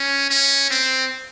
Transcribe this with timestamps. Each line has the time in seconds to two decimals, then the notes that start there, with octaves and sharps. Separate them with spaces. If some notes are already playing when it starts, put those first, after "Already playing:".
Already playing: C#4
0.31 C#4
0.71 C4